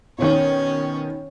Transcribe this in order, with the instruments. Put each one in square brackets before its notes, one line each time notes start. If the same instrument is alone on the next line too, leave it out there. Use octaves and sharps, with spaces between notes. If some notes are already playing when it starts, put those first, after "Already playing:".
[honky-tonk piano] B2 D#3 [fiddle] C#4 C#5